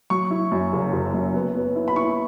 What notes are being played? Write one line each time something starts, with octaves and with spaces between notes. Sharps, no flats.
F#3 C#6
E4
F#2
F#1
F#1
F#2
B3
B3
E4
B5
E4 C#6